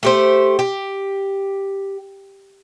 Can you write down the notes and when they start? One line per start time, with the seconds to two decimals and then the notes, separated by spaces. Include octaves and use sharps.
0.03 A3 G4 C5
0.59 G4